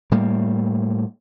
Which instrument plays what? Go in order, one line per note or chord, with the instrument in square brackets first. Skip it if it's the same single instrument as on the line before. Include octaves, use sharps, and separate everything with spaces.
[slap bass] A2 G3 A#3